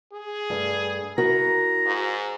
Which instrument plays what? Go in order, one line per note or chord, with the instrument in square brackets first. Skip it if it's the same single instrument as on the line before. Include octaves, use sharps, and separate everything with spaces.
[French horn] G#4
[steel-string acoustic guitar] G2 A3
[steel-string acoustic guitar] E4 F#4 A#4 [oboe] A#5
[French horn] G#2